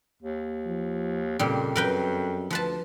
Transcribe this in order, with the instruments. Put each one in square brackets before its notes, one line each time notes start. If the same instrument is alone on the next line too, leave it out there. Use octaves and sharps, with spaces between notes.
[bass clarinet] D#2
[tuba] F3
[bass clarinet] F2 [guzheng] A#2 G3 [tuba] C#3
[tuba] F#2 [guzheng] A#4 B4 G5
[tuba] D2 [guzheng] F3 B4 A5